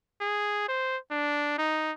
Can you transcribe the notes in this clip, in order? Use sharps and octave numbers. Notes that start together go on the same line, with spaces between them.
G#4
C5
D4
D#4